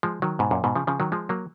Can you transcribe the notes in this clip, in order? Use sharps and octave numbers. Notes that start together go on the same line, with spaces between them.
F3 G#3
D#3 F#3
G#2 B2
F#2 A#2
G#2 B2
C#3 F3
C#3 F3
D#3 F#3
F3 G#3
F#3 A#3